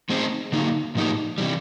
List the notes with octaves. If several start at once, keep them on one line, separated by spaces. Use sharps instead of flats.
A3 C4 D#4 G#4 C5
D3 F#3 A#3 D#4
A2 F3 A#3 D#4 G4
C3 E3 G3